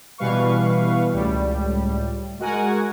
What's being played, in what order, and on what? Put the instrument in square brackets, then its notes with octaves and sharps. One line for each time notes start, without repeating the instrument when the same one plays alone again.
[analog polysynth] B2 E3 G3 B4 F5 C#6
C#2 A2 G3
G#3 F#4 A#4 F#5 G#5